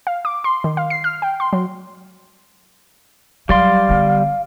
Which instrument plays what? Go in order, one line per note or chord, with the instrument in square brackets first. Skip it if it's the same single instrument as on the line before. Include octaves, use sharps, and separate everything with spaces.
[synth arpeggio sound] F5
D6
C6
D#3
F5
C7
F6
G5
C6
F#3
[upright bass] F#3 [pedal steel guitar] G3 D5 C6 [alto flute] F5
[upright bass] D3 B3